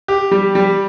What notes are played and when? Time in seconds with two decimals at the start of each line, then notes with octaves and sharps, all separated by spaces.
0.08 G4
0.31 G3
0.55 G3